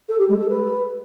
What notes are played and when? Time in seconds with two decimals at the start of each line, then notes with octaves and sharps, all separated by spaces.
0.08 A4
0.18 G4
0.29 G#3
0.39 A4
0.49 B4